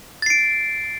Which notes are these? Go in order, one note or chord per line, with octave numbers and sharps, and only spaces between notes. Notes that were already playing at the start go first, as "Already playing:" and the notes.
A6 C7 D7